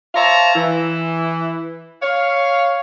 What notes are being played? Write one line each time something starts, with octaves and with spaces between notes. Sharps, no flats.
C5 C#5 E5 F5 A5 A#5
E3 E4
C#5 F5